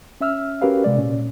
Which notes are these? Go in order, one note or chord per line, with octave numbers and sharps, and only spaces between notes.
C#4 E5 E6 F6
C#4 F#4 G4 A#4 B4 F5
C3 G#3 D5
A#2 C#4